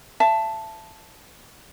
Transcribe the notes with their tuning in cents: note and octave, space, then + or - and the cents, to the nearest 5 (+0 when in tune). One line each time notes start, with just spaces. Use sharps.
E5 +30 A5 +0